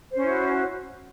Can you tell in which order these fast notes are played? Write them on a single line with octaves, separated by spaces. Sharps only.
C5 C#4 E4 F#4